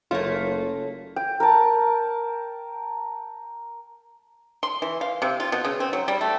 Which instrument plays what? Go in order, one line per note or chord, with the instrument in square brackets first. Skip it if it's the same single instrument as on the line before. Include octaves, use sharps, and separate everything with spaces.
[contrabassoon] F#1 [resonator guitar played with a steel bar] A3 A#3 [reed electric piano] F4 C#5
[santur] G5
A#4 A5
[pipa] C6
E3
F5
C3
F4
B2
C#3
C4
F#3
G3
A3